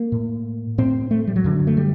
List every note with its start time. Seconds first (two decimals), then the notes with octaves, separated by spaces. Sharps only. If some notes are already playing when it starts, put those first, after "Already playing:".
Already playing: A#3
0.12 A2
0.78 A2 C4
1.11 A3
1.27 G3
1.36 F#3
1.44 F#2 D3
1.67 A3
1.77 G3